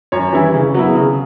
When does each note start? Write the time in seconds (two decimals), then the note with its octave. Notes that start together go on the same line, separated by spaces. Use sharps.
0.12 F#2 C#5
0.33 E3 G3 C#4 E4
0.54 C#3
0.74 F#3 B3 E4
0.95 C#3